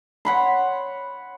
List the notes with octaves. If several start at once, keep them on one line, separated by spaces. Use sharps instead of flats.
C#5 F#5 B5 C6